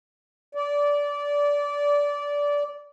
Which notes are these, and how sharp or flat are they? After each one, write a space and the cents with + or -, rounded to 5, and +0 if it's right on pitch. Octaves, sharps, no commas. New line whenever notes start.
D5 -20